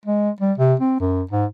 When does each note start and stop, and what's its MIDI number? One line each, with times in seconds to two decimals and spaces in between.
0.05 0.30 56
0.41 0.53 55
0.58 0.74 48
0.80 0.97 60
1.00 1.22 42
1.31 1.45 44